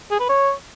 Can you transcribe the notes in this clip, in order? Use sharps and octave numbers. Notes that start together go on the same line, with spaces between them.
G#4
B4
C#5